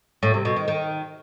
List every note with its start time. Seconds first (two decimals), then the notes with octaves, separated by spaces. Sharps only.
0.23 A2
0.34 C3
0.45 B2
0.56 D#3
0.68 D#3